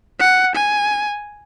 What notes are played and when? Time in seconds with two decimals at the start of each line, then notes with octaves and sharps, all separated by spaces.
0.20 F#5
0.55 G#5